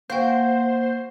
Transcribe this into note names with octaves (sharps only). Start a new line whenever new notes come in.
A#3 F#4 C5 F5 G5